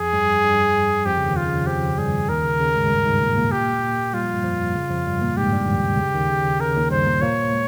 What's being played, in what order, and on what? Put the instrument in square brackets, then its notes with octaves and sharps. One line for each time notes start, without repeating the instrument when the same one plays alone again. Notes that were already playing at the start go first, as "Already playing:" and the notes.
Already playing: [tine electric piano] F2 F3 [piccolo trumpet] G#4
[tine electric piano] G2 G3
G2 G3
[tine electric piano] F2 F3 [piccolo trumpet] G4
[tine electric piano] C#3
D#2 D#3
[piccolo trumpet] F4
[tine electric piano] C#3
[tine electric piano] F2 F3 [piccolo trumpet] G4
[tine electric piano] G2 G3 [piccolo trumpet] G#4
[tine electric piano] D#2 D#3 [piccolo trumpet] A#4
[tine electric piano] C#3
C#3
G#2 G#3
G#3
G2 G3
G#2 G#3
A#2 A#3
A#2 A#3
[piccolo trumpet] G4
[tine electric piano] G3 [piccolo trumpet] F4
[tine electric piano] F3
G2 G3
F2 F3
C#3
F2 F3
G2 G3
A#2 A#3
[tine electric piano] G#2 G#3 [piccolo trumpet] G4
[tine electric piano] G2 G3
D#2 D#3
C3
C#3
D#2 D#3
C#3
[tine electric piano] C#3 [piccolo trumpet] A#4
[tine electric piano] D#2 D#3
[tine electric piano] G2 G3 [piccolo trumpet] C5
[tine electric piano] A#2 A#3
[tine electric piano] A#2 A#3 [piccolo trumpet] C#5
[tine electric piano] G#3